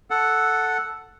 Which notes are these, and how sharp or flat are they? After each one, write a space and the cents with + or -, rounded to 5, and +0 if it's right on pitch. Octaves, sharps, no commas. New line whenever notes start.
A4 +0 F#5 +0